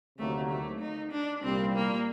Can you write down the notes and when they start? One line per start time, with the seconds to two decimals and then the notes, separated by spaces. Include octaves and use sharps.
0.18 D2 C3 D#3 F#3 A3 A#3
0.50 A3
0.80 D#4
1.11 D4
1.43 C2 A#2 G3 C4
1.75 A#3